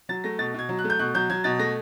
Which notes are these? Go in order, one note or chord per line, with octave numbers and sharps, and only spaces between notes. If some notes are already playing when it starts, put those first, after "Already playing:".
F#3 A6
A3 A#6
B2 A6
B2 G#6
F#3
F#6
A3
G6
B2 F#6
F#3 G6
F#3 G#6
B2 A6
A3 A#6